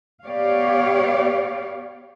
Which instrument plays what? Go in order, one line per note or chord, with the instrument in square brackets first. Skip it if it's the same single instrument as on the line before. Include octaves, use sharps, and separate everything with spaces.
[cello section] B3 G4 C#5 D5 F5